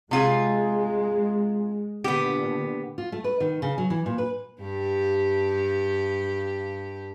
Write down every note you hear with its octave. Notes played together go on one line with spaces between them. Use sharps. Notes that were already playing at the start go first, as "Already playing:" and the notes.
C3 G#3 F4 G#4
A#2 D3 B3 G4
F4
A3
B4
D#3
C#3
F#3
E3
A#2
B4
G2 G4